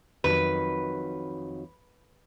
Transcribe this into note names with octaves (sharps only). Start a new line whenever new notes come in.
F2 D#3 F#3 B4